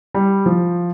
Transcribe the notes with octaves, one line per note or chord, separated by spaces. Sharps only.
G3
F3